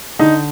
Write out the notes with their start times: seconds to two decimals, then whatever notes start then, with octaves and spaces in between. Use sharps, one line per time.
0.19 D3 D#4